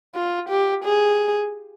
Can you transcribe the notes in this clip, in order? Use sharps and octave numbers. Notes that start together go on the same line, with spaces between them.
F4
G4
G#4